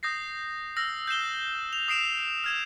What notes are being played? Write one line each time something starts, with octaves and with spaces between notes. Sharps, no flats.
D#6 G6 A#6 C7
E6 F6 A#6
G6 C7 E7 G7
F7
D#6 C7 D7 E7 F7
F6 G#6 E7